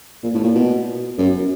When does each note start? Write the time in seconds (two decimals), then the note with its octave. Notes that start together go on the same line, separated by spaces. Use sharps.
0.23 A#2
0.34 A2
0.44 A#2
0.55 B2
1.18 F#2